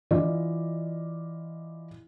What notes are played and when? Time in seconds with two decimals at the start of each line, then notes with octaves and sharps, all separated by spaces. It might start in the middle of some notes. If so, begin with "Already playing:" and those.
0.11 E3 F4 D5 D#5